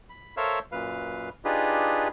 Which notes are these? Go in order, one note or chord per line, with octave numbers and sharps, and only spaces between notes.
B5
A4 A#4 C5 C#5 E5 F5
F#2 A#2 B4 F5
D4 D#4 F4 G4 G#4 B4